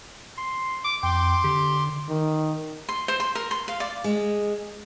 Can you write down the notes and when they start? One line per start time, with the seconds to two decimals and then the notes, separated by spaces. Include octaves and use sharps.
0.38 C6
0.84 D6
1.03 F2 G5 C6 D6
1.44 D3 G4
2.09 D#3
2.89 C6
3.08 C5
3.20 C6
3.35 A#4
3.51 C6
3.68 F5
3.80 D5
4.04 G#3